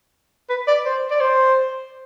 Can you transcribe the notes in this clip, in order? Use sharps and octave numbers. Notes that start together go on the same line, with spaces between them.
B4
D5
C5
D5
C5